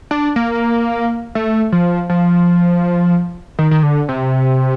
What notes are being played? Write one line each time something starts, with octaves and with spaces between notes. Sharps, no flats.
D4
A#3
A3
F3
F3
D#3
D#3
D3
C3